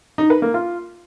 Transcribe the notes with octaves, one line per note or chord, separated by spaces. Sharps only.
D#4
B4
A#3
F4